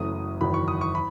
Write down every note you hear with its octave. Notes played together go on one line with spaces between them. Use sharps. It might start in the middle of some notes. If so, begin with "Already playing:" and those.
Already playing: F#1 F#2 E3 A3 C#4 D#6
F#1 E2 D#3 F#3 B5
C#6
D#6
C#6
B5